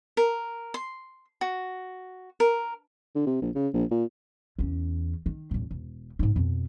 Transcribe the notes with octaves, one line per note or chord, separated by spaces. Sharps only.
A#4
C6
F#4
A#4
D3
C3
A#1
C#3
A#1
A#2
E2 C#4
D#3
D#1 A1
E1
G#2 D#4
F2 B2